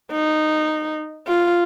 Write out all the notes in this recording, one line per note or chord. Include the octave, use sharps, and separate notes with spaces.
D#4
F4